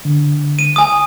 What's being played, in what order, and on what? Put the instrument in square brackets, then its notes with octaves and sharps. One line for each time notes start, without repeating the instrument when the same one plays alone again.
[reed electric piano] D3
[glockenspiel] D#7
G#5 D#6